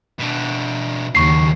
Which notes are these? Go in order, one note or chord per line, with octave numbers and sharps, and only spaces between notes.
B2 D4
D#2 C#3 A#3 C#6 C7